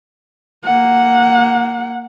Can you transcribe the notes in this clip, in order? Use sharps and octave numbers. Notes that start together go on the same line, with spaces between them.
A#3 F#5